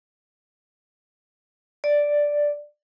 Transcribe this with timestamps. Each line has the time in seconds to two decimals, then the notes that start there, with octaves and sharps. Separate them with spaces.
1.84 D5